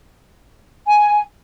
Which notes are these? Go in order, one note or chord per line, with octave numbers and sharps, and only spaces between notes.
G#5